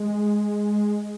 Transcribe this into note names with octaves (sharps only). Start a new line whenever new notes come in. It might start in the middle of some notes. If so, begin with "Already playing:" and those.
Already playing: G#3